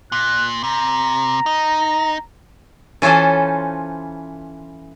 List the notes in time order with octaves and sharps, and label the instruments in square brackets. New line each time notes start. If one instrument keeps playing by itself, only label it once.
[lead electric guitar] A#2 [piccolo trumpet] F#6
[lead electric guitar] C3 [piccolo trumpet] A#5
[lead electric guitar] D#4
[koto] E3 C#4 F4 A4 C5